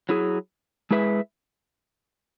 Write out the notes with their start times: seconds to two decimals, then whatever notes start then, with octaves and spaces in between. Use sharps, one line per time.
0.09 F#3 E4 G#4
0.91 G#3 E4 G#4 B4 E5